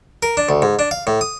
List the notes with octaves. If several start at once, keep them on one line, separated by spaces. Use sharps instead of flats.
A#4
D4
D2
G#2
D4
F5
A2
D#6